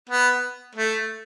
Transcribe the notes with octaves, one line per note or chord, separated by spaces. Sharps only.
B3
A3